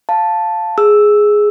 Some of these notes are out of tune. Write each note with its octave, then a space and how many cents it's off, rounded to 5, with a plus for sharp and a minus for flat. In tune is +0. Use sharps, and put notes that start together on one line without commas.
F5 +0 A5 +0
G#4 +5 E6 +0